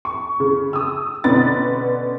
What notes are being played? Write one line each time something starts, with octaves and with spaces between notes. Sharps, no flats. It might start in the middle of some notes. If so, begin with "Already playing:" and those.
C#6
C#3
D#6 E6
B2 D3 C#4 B4 A6